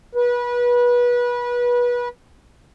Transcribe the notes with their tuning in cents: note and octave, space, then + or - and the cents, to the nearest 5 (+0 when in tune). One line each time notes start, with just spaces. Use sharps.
B4 -25